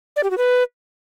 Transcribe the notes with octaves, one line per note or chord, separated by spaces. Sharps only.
D5
G4
F#4
B4